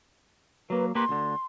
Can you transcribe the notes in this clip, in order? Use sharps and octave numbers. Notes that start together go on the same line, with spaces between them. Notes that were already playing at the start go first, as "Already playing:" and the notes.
F#3 A#3 B4
A#3 G4 B4 C6
D2 D3